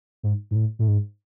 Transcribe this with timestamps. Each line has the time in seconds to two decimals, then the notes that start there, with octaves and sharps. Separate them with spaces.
0.23 G#2
0.51 G#2
0.55 A2
0.79 A2
0.88 G#2